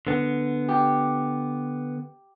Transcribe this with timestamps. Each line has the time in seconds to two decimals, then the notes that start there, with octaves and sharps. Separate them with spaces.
0.07 D3 B3
0.69 G4